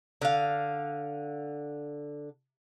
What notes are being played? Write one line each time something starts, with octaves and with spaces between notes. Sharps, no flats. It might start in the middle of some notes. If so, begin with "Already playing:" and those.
D3 F5